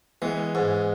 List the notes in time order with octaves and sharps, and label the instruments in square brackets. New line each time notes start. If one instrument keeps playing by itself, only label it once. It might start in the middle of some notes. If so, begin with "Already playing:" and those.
[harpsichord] E3 [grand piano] G#3 B3
[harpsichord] G#2